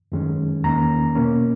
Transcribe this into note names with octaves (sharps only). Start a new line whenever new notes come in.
F#2 D#3 G#3 C#4
E2 D#3 A#3 C#4 A#5
B2 A#3 C#4